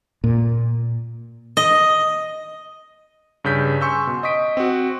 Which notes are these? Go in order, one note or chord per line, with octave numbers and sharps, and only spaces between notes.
A#2
D#5
G2 C#3 G6 B6
G#5 C6 C#6 E6 G6
B2
D#5 C#6 D#6 B6 D7
C4 F#4